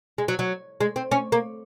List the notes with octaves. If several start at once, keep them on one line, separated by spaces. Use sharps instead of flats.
G#3
F#3
F#3
G#3
C4
C#4
A#3